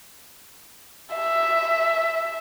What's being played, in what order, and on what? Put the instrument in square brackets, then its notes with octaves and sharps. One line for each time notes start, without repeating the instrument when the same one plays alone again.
[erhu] E5